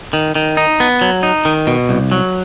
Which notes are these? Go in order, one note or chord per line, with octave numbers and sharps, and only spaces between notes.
D#3
D#3
D#4
B3
F#3
D#4
D#3
B2
C2
F#3